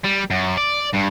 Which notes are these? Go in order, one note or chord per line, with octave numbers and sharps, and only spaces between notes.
G3
F#2
D5
G2